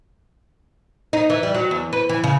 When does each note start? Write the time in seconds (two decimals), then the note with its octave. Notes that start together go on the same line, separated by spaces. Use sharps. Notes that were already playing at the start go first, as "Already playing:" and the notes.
1.13 D#4
1.30 E3
1.43 G3
1.55 F#3
1.71 E2
1.93 B4
2.09 E3
2.24 C#3